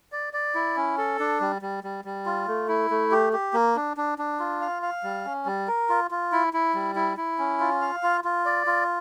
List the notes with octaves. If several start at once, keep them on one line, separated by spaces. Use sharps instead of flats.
D5
D5
E4
C#4
A4
D4
G3
G3
G3
G3
F4
A3
E4
A3
G4
G4
A#3
D4
D4
D4
F4
F5
F5
G3
C#4
G3
A#4
F4
F4
E4
E4
G3
E4
E4
C#4
F4
F5
F4
F4
D5
F4